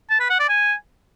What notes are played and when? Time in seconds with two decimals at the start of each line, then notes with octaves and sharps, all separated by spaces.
0.10 A5
0.20 B4
0.30 F#5
0.39 D5
0.49 G#5